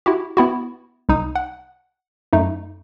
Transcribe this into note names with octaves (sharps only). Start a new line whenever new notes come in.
E4 F#4 G4
B3 E4 F#4
C2 D#4 D#6
F#5
F#2 A3 D#4